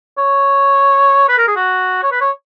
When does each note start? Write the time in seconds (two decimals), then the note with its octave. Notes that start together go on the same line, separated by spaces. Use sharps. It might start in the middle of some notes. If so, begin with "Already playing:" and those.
0.18 C#5
1.29 B4
1.38 A#4
1.47 G#4
1.56 F#4
2.03 C#5
2.11 B4
2.21 C#5